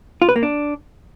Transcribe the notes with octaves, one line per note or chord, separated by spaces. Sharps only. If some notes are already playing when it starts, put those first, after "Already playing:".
F4
B4
A#3
D4